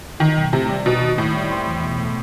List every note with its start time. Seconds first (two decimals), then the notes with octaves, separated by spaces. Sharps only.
0.20 D#3 D#4
0.37 B1
0.53 A2 C3
0.69 G3
0.85 B2 D#4
1.01 D#2
1.17 A2 D#3
1.34 G3
1.50 C4
1.67 E2
1.83 B2
1.99 A3